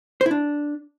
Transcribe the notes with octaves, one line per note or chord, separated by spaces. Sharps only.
C5
E4
D4